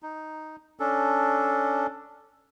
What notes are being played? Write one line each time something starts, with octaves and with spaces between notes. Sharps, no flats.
D#4
C#4 D4 A4